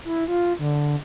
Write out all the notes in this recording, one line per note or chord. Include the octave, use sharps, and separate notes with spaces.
E4
F4
D3